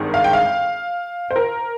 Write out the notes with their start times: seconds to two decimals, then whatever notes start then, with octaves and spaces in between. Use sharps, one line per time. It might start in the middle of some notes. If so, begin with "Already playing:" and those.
Already playing: G#1 G2 D#3 G#3
0.14 F5
0.24 G5
0.33 F5
1.31 C5
1.36 A#4